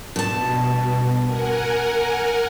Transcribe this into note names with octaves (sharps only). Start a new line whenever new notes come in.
G2 B2 A5
A#4 F#5 G#5